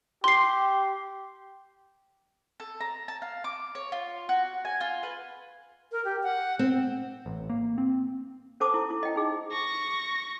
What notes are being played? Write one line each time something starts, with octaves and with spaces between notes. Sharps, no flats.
G4 C6 C7
A4
A#5
A5
F5
D6
C#5
F4
F#4
G#5
F4
B4
A#4
G4
F#5
C4
A1
A#3
C4
C#4 A4 C5 A5 D6 D#6
E4
E4
D#5 G5
D#4 G#4
C#6 A#6